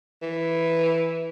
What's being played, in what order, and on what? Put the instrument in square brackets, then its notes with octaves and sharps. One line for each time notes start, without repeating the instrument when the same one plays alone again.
[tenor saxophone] E3